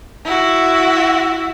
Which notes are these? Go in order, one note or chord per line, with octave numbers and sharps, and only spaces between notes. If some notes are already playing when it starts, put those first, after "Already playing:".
E4 F#4